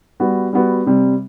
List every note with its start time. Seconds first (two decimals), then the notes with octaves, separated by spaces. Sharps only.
0.20 G3 B3 F#4
0.53 G3 B3 F#4
0.86 C3 G3 C4